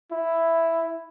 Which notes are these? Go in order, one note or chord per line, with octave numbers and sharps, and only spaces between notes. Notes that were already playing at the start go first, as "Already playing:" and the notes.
E4